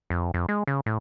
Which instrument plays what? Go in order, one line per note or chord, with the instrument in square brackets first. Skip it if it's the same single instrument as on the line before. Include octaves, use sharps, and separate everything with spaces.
[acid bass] F2
F2
G#3
C#3
A2